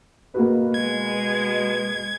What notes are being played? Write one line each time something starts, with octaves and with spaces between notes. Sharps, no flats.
B2 A#3 F#4 B4
G#3 G#6